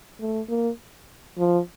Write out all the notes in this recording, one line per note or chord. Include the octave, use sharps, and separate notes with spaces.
A3
A#3
F3